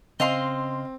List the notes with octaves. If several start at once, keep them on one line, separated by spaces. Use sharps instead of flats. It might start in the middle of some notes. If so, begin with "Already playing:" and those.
C#3 C4 D#5 F5 C6